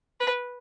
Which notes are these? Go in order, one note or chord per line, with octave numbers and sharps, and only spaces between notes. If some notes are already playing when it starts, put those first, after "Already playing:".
B4